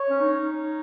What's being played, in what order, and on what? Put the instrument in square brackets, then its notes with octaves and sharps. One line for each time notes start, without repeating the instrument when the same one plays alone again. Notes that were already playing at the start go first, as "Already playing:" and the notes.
Already playing: [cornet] C#5
[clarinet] C#4
D#4